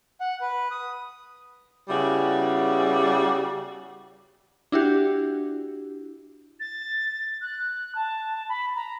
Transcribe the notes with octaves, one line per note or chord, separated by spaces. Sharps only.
F#5
B4
D#6
C#3 G3 B3 E4 F#4 G#4
D4 E4 F#4 G4
A6
F#6
A5
B5
A#5